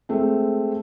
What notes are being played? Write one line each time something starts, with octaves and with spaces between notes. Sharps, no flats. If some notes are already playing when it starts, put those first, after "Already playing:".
G#3 A3 C4